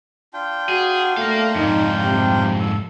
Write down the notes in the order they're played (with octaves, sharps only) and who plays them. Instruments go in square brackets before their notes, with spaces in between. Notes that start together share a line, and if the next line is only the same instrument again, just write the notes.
[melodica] D4 F4 G5
[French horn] F#4 [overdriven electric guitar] G#4
[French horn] A3 [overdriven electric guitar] A#4 F5
[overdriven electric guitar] F2 G#2 [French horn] D#4
[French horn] C3
[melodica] A4